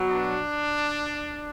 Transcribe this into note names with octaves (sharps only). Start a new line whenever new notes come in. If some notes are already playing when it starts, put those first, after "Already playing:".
Already playing: B2 F#3
D4